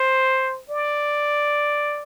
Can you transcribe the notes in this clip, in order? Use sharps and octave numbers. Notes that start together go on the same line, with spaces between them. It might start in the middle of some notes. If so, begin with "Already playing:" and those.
Already playing: C5
D5